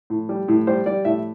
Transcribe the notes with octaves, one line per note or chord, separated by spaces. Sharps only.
A2
G3
A2
G3 C5
G3 D5
A2 E5